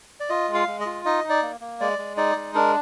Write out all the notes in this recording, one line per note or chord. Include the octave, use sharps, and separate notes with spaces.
D5
F4 D#5
G#3
F5
G#3
D#5
F4
D#4 D#5
D#4
D5
A#3
A#3
G#3 D5
G#3
D#4 D5
G#3
D4 A#4